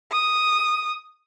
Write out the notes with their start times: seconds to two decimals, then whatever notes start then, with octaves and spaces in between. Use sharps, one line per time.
0.12 D#6